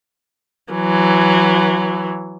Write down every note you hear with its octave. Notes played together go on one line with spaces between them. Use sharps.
E3 F#3